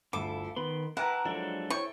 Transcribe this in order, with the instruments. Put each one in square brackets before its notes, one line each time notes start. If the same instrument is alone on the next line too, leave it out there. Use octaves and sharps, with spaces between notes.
[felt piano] G1 D2 [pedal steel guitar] E4 F4 A4 [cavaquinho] D6
[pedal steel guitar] D#3 B5 C6 [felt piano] B3
[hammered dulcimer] E3 A#4 A#5 [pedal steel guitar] E4 A5 [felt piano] B4 G5 [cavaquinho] F#5
[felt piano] F3 [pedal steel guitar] F#3 G#3 D4 [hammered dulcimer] A4
[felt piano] E4 C5 C#5 [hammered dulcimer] G5 [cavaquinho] C#6